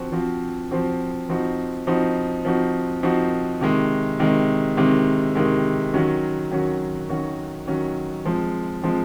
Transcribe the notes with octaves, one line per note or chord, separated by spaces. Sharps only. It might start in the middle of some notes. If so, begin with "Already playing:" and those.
Already playing: F3 C4 F#4
F3 C4 F#4
F3 C4 F#4
F3 C4 D#4 F#4
F3 C4 D#4 F#4
F3 C4 D#4 F#4
F3 C4 D#4 F#4
C3 D#3 G#3
C3 D#3 G#3
C3 D#3 G#3
C3 D#3 G#3
D#3 F#3 C#4 F#4
D#3 F#3 C#4 F#4
D#3 F#3 C#4 F#4
D#3 F#3 C#4 F#4
F3 G#3 C4
F3 G#3 C4